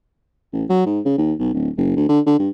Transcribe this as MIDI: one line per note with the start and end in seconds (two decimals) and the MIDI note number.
0.53 0.64 33
0.70 0.85 54
0.86 1.00 44
1.05 1.16 49
1.18 1.33 39
1.39 1.53 35
1.54 1.69 26
1.78 1.93 30
1.96 2.05 38
2.09 2.20 50
2.26 2.38 50
2.39 2.49 43